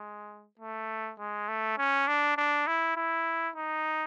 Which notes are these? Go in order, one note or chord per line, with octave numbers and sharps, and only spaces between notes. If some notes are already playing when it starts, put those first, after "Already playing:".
Already playing: G#3
A3
G#3
A3
C#4
D4
D4
E4
E4
D#4